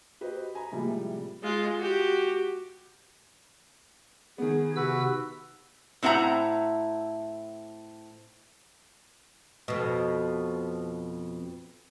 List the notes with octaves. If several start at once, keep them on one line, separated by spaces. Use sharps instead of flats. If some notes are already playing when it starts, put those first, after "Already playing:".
F#4 G4 B4 C5 D#5
D#5 G#5 A#5 B5
A2 C3 F3 G3 G#3 A#3
G#3 F4
F#4 G4
D#3 B3 G#4
C3 F#4 B4 E6
A2 C4 E4 F#5 A#5
F2 B2